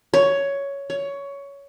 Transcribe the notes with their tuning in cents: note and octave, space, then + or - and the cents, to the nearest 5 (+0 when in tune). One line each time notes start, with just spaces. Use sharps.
C#5 +10
C#5 +15